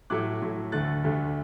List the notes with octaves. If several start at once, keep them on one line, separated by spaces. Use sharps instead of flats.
A2 F#3 A3 D6 F#6
A2 F#3 A3
D2 D3 A3 F#6 A6
D2 D3 A3